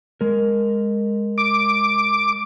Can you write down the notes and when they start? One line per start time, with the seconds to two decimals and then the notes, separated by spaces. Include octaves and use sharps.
0.21 G#3 A#4
1.38 D6